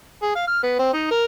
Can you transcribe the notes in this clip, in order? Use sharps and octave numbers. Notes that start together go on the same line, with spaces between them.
G#4
F5
F6
B3
C4
D#4
A#4